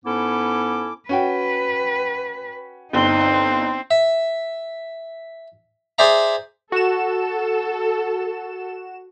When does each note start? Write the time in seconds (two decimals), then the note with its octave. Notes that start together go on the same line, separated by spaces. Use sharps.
0.05 G#2 B3 C#4 E4 A4 D6
1.09 C#4 F#4 B4 G5
2.93 G1 C4 D#4
3.91 E5
5.98 G#4 C5 D5 E5 A#5
6.72 F#4 A4 E7